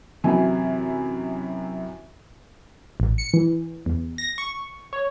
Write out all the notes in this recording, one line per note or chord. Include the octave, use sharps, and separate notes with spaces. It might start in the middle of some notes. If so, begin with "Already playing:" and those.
F#2 C3 E3 E4 G#5
A1
C#7
E3
E2
A#6
C#6
C#5